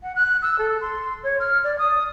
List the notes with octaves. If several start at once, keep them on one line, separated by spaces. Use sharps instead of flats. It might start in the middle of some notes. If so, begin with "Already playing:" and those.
F#5
F#6
E6
A4
C6
C#5
F6
D5
D#6